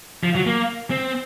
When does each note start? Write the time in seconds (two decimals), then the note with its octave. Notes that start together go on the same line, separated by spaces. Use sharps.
0.24 F3
0.35 F#3
0.47 A#3
0.91 C4